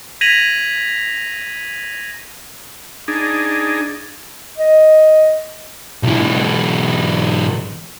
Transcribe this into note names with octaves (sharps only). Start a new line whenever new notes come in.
G#6 A#6 B6 D#7 F7 F#7
D4 D#4 G#4
D#5
B1 E3